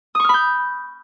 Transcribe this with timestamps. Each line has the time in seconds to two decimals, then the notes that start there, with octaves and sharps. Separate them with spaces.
0.15 D#6
0.20 C#6
0.24 F6
0.29 B5
0.34 G6